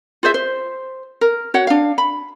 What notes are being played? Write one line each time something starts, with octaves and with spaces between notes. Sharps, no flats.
F4 G#4 C5 E5
C5
A#4
F#4 C#5 F#5
D4 F5
B5